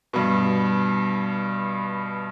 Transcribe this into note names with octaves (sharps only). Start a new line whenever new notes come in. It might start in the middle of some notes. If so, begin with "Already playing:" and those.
G2 B2